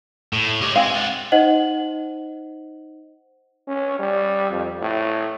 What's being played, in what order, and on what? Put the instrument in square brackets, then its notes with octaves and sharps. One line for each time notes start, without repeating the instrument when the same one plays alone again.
[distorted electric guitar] A2
[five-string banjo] G4 [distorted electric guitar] C#5 D#5
[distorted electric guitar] G#3 [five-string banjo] C4 F5
[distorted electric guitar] F4 F#5
[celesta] D#4 C5 D#5 F#5 F#7
[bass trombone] C#4
G3
F2
A2